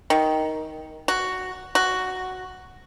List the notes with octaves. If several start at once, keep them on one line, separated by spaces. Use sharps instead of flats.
D#3
F#4
F#4